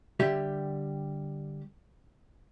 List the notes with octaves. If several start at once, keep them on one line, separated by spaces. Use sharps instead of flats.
D3 G3 G4 E5